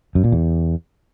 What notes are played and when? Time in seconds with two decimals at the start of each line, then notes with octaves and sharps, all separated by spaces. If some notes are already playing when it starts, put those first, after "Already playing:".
0.15 F#2
0.24 A#2
0.32 E2